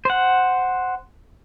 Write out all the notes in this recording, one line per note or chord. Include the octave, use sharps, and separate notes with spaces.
C5 F#5